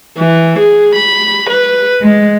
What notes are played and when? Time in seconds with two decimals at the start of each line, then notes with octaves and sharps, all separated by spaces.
0.17 E3
0.58 G#4
0.94 B5
1.50 B4
2.01 G#3